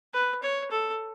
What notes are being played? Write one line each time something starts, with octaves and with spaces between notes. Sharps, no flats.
B4
C#5
A4